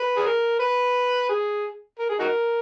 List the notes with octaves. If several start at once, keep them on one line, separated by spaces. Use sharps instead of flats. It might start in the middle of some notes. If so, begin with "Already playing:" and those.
Already playing: B4
G#4
A#4
B4
G#4
A#4
G#4
D#4 F#4 A#4